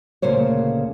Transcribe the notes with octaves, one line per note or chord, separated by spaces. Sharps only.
D2 A#2 C#3 C5 C#5